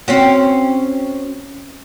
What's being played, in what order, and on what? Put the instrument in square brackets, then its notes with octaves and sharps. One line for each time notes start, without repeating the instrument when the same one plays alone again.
[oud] C4 C#4 F#4